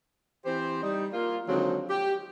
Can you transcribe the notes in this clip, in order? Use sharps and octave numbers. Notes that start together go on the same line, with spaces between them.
E3 C4 G4 C5
G3 D#4
A#3 F4
D3 D#3 F3 F#3 G#3 C4
G4